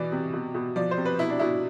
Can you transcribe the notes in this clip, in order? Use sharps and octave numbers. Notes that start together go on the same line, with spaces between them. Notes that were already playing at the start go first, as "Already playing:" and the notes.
Already playing: B2 E3 D5
C3
B2
B2
F3 D5
C5
C3
B4
B2 E4
D4
B2 E4